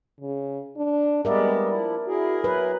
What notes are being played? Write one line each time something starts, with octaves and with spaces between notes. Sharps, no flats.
C#3
D4
G3 G#3 B3 A#4 D5 E5
F3 E4
E4 F#4 G#4 A#4
F#3 B4